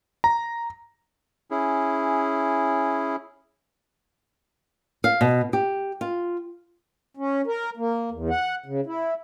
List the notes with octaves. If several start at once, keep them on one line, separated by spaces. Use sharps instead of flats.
A#5
C#4 E4 G#4
F5
B2
G4
F4
C#4
A#4
A#3
E2
F#5
C#3
E4